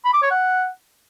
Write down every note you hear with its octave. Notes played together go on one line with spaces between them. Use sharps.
B5
D6
C#5
F#5